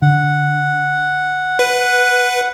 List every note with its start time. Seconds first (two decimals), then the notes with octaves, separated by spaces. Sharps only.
0.02 D3 F#5
1.59 B4